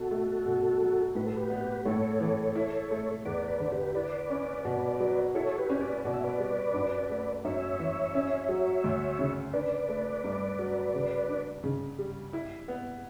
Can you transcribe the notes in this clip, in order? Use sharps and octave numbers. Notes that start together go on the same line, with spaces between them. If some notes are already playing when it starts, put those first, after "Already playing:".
Already playing: B2 F#4 A4
A3
B2
F#3
A2 B4
A4
G4 B4
B3
A2 A4 C#5
E3
E4
A3
E2 B4 D5
B4 D5
D3
G4 B4
E4 B4 D5
C#4
B2
F#3
E4 A4 C#5
G4 B4
C#4
B4 D5
B2 D5
E5
B4 D5
G3
F#2
A3
F#2 C#5 E5
E3
C#4
F#3
D2
C#3
D4 B4 D5
A3
G2
F#3
C#3
D4
C#3
G3
E4
B3